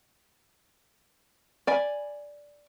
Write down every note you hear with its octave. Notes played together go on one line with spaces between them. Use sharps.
D5 G#5 B5